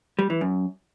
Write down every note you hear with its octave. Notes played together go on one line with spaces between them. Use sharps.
G3
E3
F#2